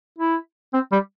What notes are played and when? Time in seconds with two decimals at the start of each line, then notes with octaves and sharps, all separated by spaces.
0.18 E4
0.73 C4
0.92 G3